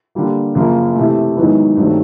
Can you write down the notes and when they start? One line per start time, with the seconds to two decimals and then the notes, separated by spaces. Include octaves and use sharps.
0.15 D3 G3 A#3
0.55 F#2 C#3 F3 A#3
0.96 C3 E3 A3
1.37 G#2 D#3 F#3 B3 E4
1.77 G2 D#3 F#3 A3 C4